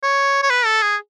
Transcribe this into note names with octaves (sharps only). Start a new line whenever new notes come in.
C#5
C#5
B4
A4
G#4